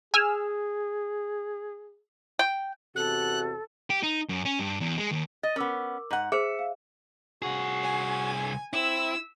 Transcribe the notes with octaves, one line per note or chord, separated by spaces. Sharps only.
G#4 G#5 E6 F6
G5
E2 C3 F#4 A4 F#6
G4
D#4
F#2
C#4
G2
E2
G#3
D#2
D#5 A6
B3 C#4 A#4 D6 E6
G#2 F#5
G#4 C5 E5 C#7
F5
C2 F#4 G#4
G#5
C4 E4 E6